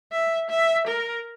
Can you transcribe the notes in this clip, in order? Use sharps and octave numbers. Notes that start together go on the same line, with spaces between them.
E5
E5
A#4